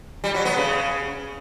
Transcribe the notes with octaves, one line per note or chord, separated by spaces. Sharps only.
G3
F#3
B3
C#3